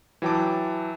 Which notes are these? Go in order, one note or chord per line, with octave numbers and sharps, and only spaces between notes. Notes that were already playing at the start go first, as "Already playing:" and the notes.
E3 F#3 G5 A5 D6